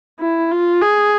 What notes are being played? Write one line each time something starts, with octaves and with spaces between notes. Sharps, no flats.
E4
F4
G#4